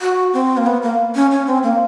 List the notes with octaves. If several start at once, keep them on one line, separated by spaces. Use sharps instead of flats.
F#4
C4
A#3
B3
A#3
C#4
C#4
C4
A#3